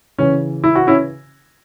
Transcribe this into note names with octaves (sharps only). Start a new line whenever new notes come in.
C#3 E3 C#4
E4
F#4
C#4 E4